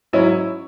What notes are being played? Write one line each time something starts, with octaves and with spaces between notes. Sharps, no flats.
G#2 F#3 C#4 E4